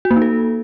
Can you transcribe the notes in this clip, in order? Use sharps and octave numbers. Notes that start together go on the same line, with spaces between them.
F#4
A#3
D#4
A4